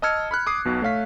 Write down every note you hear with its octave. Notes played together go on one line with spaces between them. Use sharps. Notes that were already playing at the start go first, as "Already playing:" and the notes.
D#5 A5 E6 F6 G#6 C#7
B5 F6 F#6
D6 D#6 C7
B1 B2
A3 C#5 F5 B6